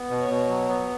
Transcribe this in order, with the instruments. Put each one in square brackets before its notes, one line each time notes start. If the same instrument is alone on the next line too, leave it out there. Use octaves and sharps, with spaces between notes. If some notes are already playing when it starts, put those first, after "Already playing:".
Already playing: [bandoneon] B3
B2
[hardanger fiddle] C#5
[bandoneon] B2
F#3
B3